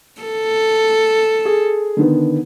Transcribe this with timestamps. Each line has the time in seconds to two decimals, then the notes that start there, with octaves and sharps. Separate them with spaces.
0.21 A4
1.45 G#4
1.97 D3 D#3 B3